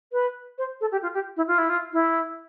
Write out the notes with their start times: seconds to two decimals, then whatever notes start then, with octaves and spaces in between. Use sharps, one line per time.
0.12 B4
0.58 C5
0.81 A4
0.92 G4
1.03 F4
1.14 G4
1.37 E4
1.48 F4
1.58 E4
1.69 F4
1.93 E4